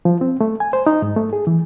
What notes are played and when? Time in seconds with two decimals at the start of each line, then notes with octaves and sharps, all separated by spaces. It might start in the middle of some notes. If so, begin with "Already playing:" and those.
0.05 F3
0.21 C4
0.41 A3
0.60 G#5
0.73 C5
0.87 D#4
1.02 G#2
1.16 A3
1.33 G#4
1.47 E3